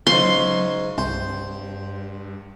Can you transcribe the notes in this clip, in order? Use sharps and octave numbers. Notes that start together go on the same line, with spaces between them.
G#2 C#3 F#3 C#4 C6
C2 G2 C5